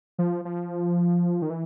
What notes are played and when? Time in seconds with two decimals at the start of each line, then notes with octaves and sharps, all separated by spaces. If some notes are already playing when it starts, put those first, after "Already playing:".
0.19 F3
0.45 F3
1.42 D#3
1.50 E3